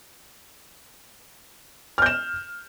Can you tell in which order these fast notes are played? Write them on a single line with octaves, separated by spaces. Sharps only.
F6 G6 E7